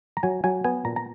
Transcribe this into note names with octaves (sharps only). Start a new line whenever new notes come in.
A#5
F#3 G#5
F#3 G#5
B3 G#5
A#2 A#5
A#5